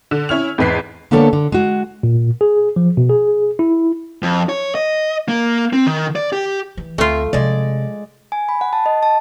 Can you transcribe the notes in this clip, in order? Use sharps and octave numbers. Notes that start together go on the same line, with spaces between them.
D3
C#4 E4 C#5 F6 F7
E2 G#2 B4 B6 C7
D3 A#3 B3 D4 A4 C#5
D3
G#3 F#4
A#2
G#4
F3
B2
G#4
E4
F2
C#5
D#5
A#3
C4
D#3
D5
G4
E3
D2 A3 C4 F4 E5
C3 F3 G#3 D5
G#5
B5
F#5
A5
D#5
A5